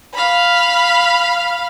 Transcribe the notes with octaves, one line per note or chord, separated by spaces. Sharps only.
F5 B5